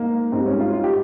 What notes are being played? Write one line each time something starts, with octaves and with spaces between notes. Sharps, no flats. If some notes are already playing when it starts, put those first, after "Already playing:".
Already playing: G#2 A#3
G#2 G3 C4
C#4
F4
F4
G4